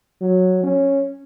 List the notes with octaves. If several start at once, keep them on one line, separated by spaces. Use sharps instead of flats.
F#3
C#4